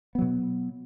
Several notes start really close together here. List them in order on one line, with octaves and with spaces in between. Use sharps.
B3 F#3 B2